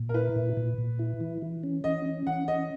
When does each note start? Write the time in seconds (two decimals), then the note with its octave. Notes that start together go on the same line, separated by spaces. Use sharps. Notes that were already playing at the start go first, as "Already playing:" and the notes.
Already playing: A#2
0.09 A#4
0.14 E4 B4
0.36 A#2
0.57 A#2
0.78 A#2
0.99 E4
1.21 E3
1.42 E3
1.64 C#4
1.84 E3 D#5
2.06 C#4
2.27 E3 F#5
2.48 C#4 D#5